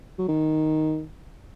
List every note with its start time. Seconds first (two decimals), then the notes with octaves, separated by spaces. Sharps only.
0.19 F#3
0.28 D#3